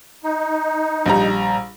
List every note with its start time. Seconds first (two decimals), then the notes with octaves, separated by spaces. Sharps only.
0.23 D#4
1.06 A#1 G3 A#5